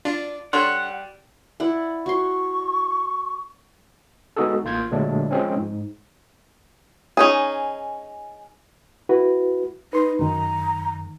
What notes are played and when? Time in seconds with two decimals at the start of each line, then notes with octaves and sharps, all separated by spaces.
0.05 D4 F4 D5
0.53 G3 D4 A4 C#5 F#5 C6
1.60 E4 D5 F#5
2.06 F#4 C6 C#6
4.37 G#3 B3 D#4 F#4 G#4 A4
4.64 A1 A#3 F4 G6 G#6
4.91 A#2 D3 F#3 G#3 A3 D4
5.31 F3 G#3 C4 C#4
5.57 G#2
7.17 C#4 D#4 G#4
9.09 E4 F#4 B4
9.93 D#4 B4 C6
10.19 F#2 D#3 A#5